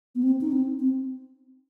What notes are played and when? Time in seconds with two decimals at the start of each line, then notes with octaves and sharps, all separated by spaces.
0.15 B3
0.23 C4
0.41 D#4
0.52 C4
0.79 C4